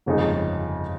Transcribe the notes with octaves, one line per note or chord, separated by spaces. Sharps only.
G1 F2 C#3 G#3 D#4